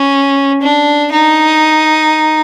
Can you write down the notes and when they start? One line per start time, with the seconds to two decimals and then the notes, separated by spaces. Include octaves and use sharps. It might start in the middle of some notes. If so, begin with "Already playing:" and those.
Already playing: C#4
0.62 D4
1.12 D#4